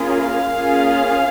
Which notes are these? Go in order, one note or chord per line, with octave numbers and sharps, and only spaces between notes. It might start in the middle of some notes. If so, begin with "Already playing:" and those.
Already playing: A#3 C#4 F4 G#4
F5
A#3 C#4 F4 G#4